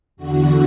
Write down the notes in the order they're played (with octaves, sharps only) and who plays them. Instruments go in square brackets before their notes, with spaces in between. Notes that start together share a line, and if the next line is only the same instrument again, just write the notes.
[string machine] E2 D3 F#4